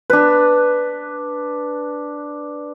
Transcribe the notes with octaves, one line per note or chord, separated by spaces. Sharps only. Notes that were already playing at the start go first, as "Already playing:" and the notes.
D4 B4